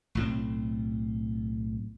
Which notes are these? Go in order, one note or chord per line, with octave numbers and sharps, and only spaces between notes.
B1 A2 C4